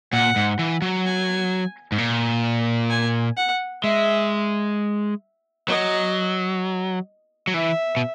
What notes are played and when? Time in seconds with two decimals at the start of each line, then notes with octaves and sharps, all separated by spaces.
0.12 A#2 F#5
0.36 G#2
0.59 E3
0.82 F#3
1.05 G#5
1.92 G#2
1.98 A#2
2.90 G#5
3.37 F#5
3.83 G#3 E5
5.68 F#3 D#5
7.47 F#3
7.54 E3 E5
7.97 B2